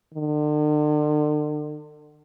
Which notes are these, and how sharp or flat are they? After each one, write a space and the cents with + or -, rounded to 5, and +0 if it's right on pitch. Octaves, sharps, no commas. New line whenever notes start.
D3 +40